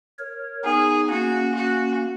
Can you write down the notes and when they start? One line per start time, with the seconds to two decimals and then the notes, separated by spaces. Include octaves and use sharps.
0.19 A#4 C#5
0.64 B3 D#4 G#4
1.09 A#3 C#4 F#4
1.54 F#4